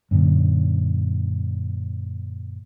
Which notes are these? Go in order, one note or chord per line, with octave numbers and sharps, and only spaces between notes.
F#2 A#2 D3